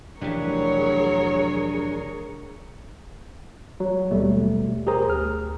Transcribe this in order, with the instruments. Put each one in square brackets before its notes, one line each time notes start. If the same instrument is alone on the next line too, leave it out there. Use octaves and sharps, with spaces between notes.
[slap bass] F1 E3 [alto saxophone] F#3 [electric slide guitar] D4 G4 [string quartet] G#4 A#4 C#5
[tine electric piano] F#3
D#2 B2 G3 A3
G4 G#4 A#4 C5 A#5 D#6
D2 F6